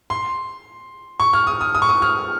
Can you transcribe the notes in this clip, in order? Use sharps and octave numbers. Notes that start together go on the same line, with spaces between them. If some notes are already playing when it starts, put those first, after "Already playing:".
C6
C#6
F6
D#6
D#6
D#6
C#6
D#6
F6